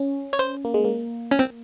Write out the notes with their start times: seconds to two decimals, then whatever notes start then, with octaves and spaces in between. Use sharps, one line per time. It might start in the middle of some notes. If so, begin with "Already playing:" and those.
Already playing: C#4
0.33 C#5
0.39 C5
0.65 A#3
0.74 G#3
0.85 A#3
1.31 C#4
1.39 C4